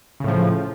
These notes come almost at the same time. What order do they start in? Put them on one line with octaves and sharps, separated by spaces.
C#3 A2 F3